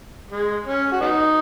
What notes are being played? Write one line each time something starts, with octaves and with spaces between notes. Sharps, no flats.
G#3
C#4
F#4
F#3 B3 D#4